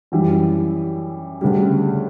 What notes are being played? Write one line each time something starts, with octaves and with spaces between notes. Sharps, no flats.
F#2 E3 G3
D2 C#3 G3